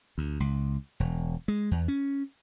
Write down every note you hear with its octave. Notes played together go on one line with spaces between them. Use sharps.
D2
C#2
E1
G#3
E2
C#4